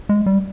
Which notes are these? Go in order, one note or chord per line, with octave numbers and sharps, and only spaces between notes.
G#3
G3